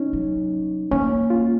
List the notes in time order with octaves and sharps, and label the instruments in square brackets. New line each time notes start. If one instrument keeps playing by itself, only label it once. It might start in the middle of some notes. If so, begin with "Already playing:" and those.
Already playing: [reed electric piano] C#4 D#4
[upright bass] F#3
[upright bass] A#3 [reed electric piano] C#4
[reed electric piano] F4